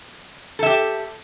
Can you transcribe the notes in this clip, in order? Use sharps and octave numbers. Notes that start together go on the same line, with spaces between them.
G4 A4 E5